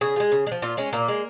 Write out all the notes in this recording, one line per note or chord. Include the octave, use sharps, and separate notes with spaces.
C#3 G#4
F3
G#3
C#3
G#3
F3
A#2 F4
G#3 C#4
A#2 A#3
G#3